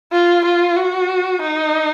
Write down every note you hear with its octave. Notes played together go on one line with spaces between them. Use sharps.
F4
F4
F#4
D#4